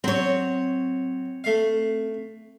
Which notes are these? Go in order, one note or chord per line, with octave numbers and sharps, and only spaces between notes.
F#3 C4 C#5
A3 F5